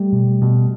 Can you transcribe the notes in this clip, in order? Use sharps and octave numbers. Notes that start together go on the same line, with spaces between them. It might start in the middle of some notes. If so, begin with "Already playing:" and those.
Already playing: G3 A3
B2
B2